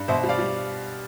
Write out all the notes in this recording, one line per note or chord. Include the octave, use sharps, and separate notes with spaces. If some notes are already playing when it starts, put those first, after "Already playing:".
Already playing: G2
B2 C5 E5
G3
D5 F5
G3